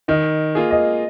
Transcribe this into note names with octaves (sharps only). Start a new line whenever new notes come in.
D#3 D#5
A#3 F4 G#4
D#5